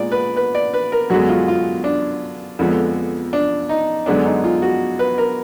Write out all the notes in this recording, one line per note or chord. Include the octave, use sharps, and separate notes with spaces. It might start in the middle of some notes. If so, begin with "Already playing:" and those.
Already playing: A#2 G#3 B3 D5
B4
B4
D5
B4
A#4
F#2 D3 G#3 B3 F#4
F4
F4
D4
F2 D3 F3 G#3 B3
D4
D#4
F#2 D3 G#3 B3 D4
D#4
F4
F#4
B4
A#4